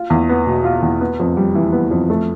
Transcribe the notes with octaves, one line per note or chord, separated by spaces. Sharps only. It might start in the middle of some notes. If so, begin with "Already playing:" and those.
Already playing: F4
E2
B3
B2
F4
E2
B3
F2
G3
E3
B3
F2
A3